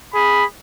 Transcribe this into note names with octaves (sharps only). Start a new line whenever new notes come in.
G#4 B5